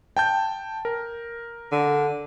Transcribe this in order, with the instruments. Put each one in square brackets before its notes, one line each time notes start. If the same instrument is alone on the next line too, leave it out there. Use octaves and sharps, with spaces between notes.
[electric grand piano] G5 A5 G6
A#4
[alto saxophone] D3